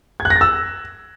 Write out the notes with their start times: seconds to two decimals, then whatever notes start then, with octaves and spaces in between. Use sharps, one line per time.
0.20 G#6
0.25 F#6
0.30 A#6
0.36 A6
0.41 E6